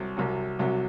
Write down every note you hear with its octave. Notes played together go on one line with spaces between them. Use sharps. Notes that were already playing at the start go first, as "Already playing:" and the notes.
Already playing: C2 C3 F#3
C2 C3 F#3
C2 C3 F#3